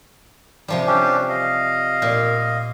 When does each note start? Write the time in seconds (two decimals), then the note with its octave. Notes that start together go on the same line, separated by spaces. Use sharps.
0.68 C3 F3 G3
0.87 C#4 D4 G4
1.29 D#5 F5
2.02 A#2